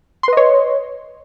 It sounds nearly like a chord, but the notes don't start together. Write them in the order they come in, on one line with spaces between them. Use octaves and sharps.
C6 B4 D#5 C#5